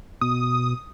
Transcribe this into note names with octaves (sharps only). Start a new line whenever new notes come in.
B2 D#6